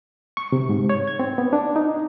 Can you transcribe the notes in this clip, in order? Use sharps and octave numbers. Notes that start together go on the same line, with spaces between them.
C#6
C3
G#2
C#5
G#6
C4
B3
D4
D#4